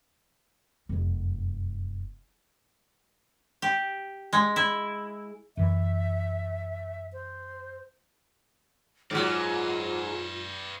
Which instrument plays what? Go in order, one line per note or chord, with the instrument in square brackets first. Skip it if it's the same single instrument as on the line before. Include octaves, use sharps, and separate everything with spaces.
[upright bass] F1 F#2
[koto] G4
G#3
E4
[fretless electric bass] F#2 E3 [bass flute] E5
[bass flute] C5
[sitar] G#2 F#3 [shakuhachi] F4 [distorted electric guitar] B4 D5